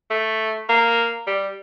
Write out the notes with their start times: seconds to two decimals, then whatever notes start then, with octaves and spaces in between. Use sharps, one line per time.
0.10 A3
0.69 A#3
1.27 G3